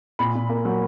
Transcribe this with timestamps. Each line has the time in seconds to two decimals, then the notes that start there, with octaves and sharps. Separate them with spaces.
0.19 A#2 B5
0.35 A#2
0.49 A#3
0.65 F#3